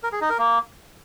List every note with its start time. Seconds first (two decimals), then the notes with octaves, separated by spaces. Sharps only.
0.03 A#4
0.12 G#4
0.21 D#4
0.30 A#4
0.39 A#3